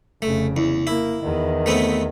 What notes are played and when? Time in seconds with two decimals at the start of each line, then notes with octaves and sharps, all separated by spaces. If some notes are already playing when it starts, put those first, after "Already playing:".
0.22 F1 C#3 A3
0.57 E2
0.87 A#3 E4
1.23 E2 D#3
1.66 A3 B3 C4